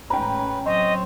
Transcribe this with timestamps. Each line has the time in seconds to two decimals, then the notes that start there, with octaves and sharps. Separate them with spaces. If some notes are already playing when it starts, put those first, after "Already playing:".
0.10 A1 G#3 C#4 B4 G5 A#5
0.66 F#3 C4 C5 C#5 D#5